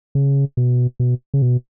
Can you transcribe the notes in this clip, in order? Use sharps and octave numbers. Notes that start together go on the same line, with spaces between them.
C#3
B2
B2
C#3
B2